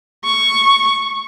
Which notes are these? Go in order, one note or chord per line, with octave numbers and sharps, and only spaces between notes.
C#6